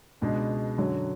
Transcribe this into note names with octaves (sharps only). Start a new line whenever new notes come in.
C#2 B2 G#3 D4
F#2 D3 F#3